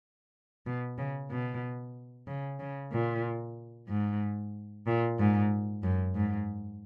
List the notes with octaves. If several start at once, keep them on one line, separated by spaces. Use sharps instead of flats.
B2
C#3
B2
C#3
C#3
A#2
G#2
A#2
G#2
F#2
G#2